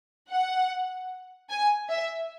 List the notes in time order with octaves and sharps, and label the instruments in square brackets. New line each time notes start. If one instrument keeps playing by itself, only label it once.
[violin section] F#5
G#5
E5